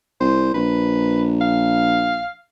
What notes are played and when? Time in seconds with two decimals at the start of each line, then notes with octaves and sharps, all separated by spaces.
0.20 C2 C5
0.54 A#1 B4
1.41 F5